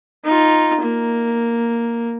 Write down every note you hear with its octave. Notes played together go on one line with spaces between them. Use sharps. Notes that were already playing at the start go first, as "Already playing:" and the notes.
D#4 F4
A#3